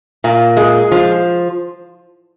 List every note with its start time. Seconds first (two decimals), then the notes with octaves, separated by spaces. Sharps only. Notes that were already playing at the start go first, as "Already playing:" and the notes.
0.24 A#2
0.57 G#3
0.91 F3